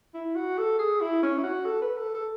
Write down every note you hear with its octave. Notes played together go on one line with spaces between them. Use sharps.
E4
F#4
A4
G#4
E4
C#4
E4
F#4
A4
B4
A4
A4